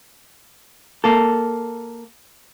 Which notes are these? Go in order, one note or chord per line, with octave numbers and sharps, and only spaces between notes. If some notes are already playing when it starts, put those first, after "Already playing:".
A#3 A4